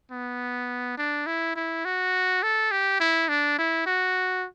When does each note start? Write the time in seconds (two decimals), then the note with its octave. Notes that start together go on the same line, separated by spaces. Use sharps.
0.11 B3
0.98 D4
1.27 E4
1.56 E4
1.85 F#4
2.43 A4
2.71 G4
3.00 E4
3.29 D4
3.59 E4
3.86 F#4